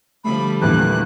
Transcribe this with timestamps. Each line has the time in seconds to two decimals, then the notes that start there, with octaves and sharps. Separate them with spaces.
0.24 D3 F3 G3 A3 B5
0.62 A#1 E2 A#2 F#6